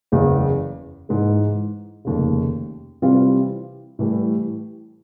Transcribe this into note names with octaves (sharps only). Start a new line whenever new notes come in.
F#1 E2 C#3
G#2 E3 G#3
F1 D#2 C#3
C3 E3 G3 C4 F4
A2 E3 G3